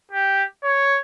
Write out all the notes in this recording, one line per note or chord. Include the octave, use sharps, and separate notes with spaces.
G4
C#5